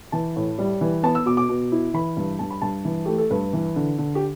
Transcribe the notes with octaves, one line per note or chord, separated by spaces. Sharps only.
E3 A5
A2
G3
E3
B3 A5
E6
B2 D6
D6
B2
E4
E3 B5
G2
G2 A5
B5
G2 A5
E3
A3 G4
A4
G2 B4
E3
D3
D3
G4